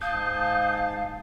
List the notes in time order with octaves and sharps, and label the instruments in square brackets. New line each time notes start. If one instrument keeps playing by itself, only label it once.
[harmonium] G#2 A5 [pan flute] F5 [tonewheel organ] D#6 G6